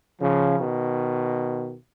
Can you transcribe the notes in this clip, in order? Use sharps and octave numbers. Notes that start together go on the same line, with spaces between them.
C#3 F3
B2 D#3